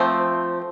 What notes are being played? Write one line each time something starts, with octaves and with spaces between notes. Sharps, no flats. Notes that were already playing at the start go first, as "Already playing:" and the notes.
Already playing: F3 A3 C4